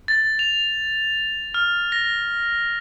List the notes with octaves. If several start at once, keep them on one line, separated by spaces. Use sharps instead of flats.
A6
F7
F6
A#6